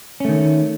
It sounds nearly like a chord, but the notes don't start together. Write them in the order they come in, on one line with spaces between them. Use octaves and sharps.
C#4 A3 D#3